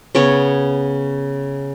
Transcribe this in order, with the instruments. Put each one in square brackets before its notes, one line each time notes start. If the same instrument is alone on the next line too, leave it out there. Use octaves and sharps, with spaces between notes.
[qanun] C#3 B3 C#5